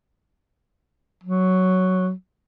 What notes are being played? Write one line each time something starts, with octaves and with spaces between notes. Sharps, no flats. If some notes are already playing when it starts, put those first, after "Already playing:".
F#3